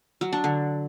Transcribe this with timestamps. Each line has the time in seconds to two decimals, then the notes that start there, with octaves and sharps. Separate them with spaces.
0.21 F#3
0.33 D4
0.44 D3